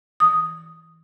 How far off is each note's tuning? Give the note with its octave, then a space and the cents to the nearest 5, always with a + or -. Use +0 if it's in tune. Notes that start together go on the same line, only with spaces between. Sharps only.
E3 -20 D#6 +0